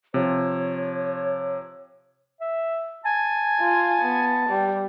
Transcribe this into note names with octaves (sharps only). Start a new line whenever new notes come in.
C3 F3 C#5
E5
G#5 A5
F4
B3
G3